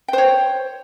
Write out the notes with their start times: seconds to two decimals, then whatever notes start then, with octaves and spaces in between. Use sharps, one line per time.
0.08 G5
0.13 C5
0.18 C#5